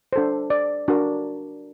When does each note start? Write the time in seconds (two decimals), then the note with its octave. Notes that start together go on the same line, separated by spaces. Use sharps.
0.13 D4 A4 C5
0.50 D5
0.88 D4 F#4 A#4